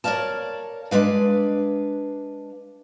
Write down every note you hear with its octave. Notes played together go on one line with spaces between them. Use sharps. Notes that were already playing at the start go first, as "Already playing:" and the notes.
A#4 C#5 D5 F5 A5
G#3 D4 B4 F5